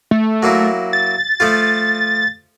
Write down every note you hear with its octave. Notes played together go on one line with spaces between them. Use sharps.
A3
F#3 A#3 E4
A6
F3 A3 F4